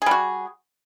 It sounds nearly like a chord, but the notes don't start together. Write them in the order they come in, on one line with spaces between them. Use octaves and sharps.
G#4 G3 F#4